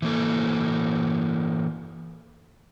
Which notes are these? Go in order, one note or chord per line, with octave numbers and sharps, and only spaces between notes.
E3 A#3 A4